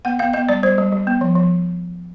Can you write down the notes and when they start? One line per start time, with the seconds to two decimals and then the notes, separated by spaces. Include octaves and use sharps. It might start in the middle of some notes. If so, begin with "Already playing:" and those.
0.05 B3 F#5
0.19 B3 F5
0.33 B3 D#5
0.49 G3 D5
0.63 G3 C5
0.78 G3
0.92 G3
1.07 B3
1.21 F3
1.36 F3